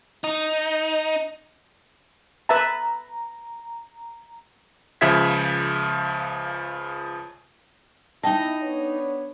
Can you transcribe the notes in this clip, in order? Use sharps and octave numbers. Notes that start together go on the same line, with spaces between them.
D#4
B4 E5 A5 A#5
C#2 C#3 F3 E5 G#6 B6
D#4 E4 D#5 G5 A5
B3 D4 C#5